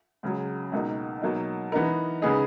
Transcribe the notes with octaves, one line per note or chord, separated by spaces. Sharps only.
C#2 C#3 F#3
C#2 B2 A#3 D#4
B2 F#3 A#3 D#4
E3 B3 D#4 A#4
C#3 G#3 B3 D#4 G#4